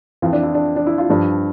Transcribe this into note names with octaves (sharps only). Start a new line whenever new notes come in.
F2 E3 F4
D4
E4
D4
D4
E4
F4
G2 F3 D4